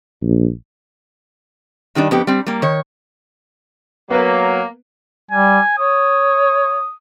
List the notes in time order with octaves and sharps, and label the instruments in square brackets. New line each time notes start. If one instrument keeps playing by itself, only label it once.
[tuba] A#1
[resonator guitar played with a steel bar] G2 D#3 G3 D4
F2 B3 G4
G3 C4
G3 A#3
D#3 C#5
[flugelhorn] F#3 [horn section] A#3 [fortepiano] B3 B4
[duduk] G3 [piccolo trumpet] G#5
[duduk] C#5 [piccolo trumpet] D#6